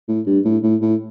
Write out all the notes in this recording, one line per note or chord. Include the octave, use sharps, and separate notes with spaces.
A2
G2
A2
A2
A2